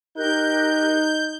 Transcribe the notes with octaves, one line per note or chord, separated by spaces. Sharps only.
D#4 G4 A#4 F#6 G6